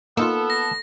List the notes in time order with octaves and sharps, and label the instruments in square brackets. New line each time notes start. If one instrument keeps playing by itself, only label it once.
[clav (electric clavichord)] A#3 D#4 F4 [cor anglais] B3 [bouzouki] A4
[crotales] A#6